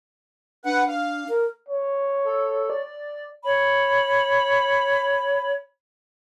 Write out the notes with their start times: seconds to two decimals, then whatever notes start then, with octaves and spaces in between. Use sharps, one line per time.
0.65 D4 B4 F#5
0.88 F5
1.29 A#4
1.68 C#5
2.25 A4
2.70 D5
3.44 C#5 B5